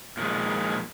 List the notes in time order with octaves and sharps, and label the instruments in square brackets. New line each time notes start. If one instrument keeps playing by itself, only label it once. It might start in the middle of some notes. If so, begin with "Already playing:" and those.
[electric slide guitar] A#2 D#3 F3 G#3